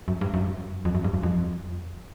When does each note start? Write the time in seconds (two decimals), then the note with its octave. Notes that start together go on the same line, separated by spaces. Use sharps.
0.08 F#2
0.21 G2
0.34 F#2
0.85 F2
0.95 F#2
1.04 G2
1.14 F#2
1.23 F2